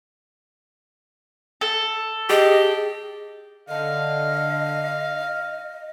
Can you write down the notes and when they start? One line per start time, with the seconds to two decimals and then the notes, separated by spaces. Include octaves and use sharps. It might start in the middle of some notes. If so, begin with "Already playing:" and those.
1.61 A4
2.30 G4 G#4 D#5 G5
3.69 D3 D#5 F5